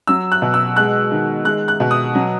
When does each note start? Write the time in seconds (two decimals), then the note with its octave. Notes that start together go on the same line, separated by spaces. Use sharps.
0.07 F#3 E6
0.32 F#6
0.42 B2
0.54 E6
0.76 G#3 F#6
1.12 D#3
1.45 G#3 F#6
1.68 F#6
1.80 B2
1.91 D#6
2.15 F#3